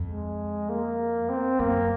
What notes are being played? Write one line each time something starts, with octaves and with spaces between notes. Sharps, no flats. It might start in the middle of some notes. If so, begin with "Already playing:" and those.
Already playing: F2
G#3
A#3
C4
F#2 A#3